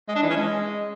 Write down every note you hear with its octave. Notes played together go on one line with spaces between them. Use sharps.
G#3
D4
E3
C#4
G#3